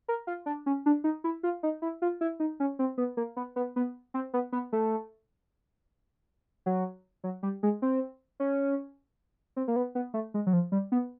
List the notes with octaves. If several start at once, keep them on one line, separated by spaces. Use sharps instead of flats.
A#4
F4
D4
C#4
D4
D#4
E4
F4
D#4
E4
F4
E4
D#4
C#4
C4
B3
A#3
B3
B3
B3
C4
B3
B3
A3
F#3
F#3
G3
G#3
C4
C#4
C4
A#3
B3
B3
A3
G#3
F#3
F3
G3
B3